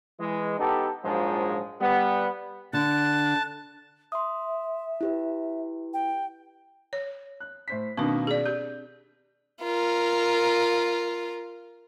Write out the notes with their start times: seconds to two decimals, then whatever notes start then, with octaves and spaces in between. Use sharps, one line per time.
0.20 E3 G#3
0.59 B3 D#4 G4 A4
1.04 A#1 G#2 F3 F#3 G#3
1.81 G3 B3
2.73 D3 A5 F#6
4.12 E5 C6 D#6
5.01 E4 G4 B4
5.94 G5
6.93 C#5
7.40 F#6
7.68 A2 C5 B6
7.97 B2 D#3 A#3 C4 D4
8.27 G#4 D5
8.46 G4 G6
9.63 F4 A#4